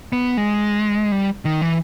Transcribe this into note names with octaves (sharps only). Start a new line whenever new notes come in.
B3
G#3
G3
D#3
E3